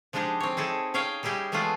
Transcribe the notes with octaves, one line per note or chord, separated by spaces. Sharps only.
F3 G#3 D4 D#4 G4 G#4
C4 C#5
D#4 E4 G#4 A4
C#4 G#4 C#5 F5 G5
G3 D#4 E4 G4 G#4
E3 G#3 A3 B3 F4 G#4